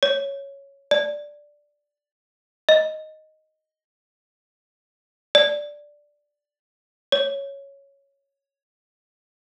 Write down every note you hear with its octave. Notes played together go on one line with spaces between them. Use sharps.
C#5
D5
D#5
D5
C#5